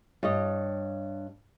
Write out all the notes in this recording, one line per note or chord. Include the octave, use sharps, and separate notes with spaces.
G2 C#5 D#5